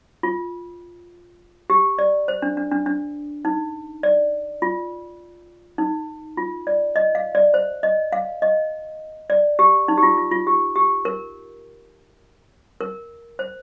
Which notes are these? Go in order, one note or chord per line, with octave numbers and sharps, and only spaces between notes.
F4
G4
D5
C5
D4
D4
D4
D4
D#4
D5
F4
D#4
F4
D5
D#5
F5
D5
C5
D#5
F5
D#5
D5
G4
D#4
G4
F4
F4
F4
G4
G4
A#4
A#4
C5